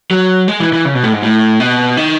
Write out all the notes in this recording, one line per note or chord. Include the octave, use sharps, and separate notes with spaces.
F#3
G#3
E3
E3
C#3
B2
A2
G#2
A2
B2
D#3